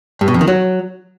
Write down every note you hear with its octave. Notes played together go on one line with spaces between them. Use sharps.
G2
B2
F2
D#3
F#3